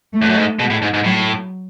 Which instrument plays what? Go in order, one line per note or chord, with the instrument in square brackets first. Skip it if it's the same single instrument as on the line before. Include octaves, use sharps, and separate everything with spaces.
[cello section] A3
[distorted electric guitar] E2
F#2
G#2
[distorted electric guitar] B2 [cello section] G#3
[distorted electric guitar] A2
G#2
G#2
[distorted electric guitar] A2 [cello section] F#3